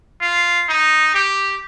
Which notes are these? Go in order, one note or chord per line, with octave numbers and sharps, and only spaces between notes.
F4
D#4
G4